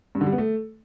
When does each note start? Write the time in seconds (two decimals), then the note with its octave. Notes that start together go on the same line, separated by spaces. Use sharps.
0.15 G2
0.21 D3
0.27 G3
0.32 B3
0.38 A3